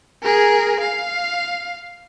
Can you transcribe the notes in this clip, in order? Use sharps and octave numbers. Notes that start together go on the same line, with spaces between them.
G#4 A#4
F5